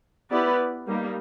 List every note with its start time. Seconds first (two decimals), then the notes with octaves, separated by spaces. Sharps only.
0.30 B3 E4 G4 B4 D5
0.87 G3 A#3 D#4